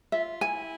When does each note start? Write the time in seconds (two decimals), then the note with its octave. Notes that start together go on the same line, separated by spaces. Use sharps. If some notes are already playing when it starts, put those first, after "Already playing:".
0.12 F4 E5
0.41 E4 G#5